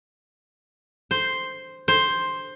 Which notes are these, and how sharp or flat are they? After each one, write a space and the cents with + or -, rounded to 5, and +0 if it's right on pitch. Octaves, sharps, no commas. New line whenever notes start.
C5 +0
C5 +5